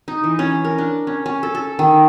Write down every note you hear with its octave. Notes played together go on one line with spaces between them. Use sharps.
D#4
E3
C#4
A#4
D4
C#4
C#4
A4
A4
D#3